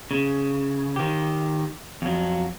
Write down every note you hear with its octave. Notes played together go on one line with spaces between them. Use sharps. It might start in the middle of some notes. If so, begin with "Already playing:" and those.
C#3
D#3 G4
F2 F#3